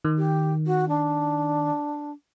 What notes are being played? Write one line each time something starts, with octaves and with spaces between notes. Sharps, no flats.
D#3
G4
F#4
D4